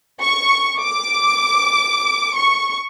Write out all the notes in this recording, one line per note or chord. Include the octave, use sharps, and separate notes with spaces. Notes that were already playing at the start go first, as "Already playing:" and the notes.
C#6
D6
C#6